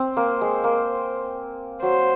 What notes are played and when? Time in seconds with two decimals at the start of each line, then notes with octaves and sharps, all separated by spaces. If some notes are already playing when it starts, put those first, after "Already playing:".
Already playing: C4 C5
0.17 A#3
0.41 G#3
0.64 A#3
1.82 F#3 C5